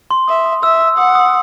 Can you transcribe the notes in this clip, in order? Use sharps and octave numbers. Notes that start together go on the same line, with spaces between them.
C6
E5 D#6
D#6
E5 E6
E6
F#5 D#6
D#6